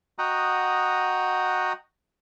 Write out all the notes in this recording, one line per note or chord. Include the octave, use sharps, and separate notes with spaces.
F#4 D#5 F#5 G5 A#5 D#6